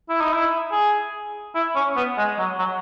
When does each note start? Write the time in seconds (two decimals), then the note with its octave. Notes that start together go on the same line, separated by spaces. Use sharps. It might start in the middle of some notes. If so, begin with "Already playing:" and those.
0.09 E4
0.21 D#4
0.33 E4
0.71 G#4
1.55 E4
1.76 C#4
1.97 B3
2.18 G#3
2.38 F#3
2.59 F#3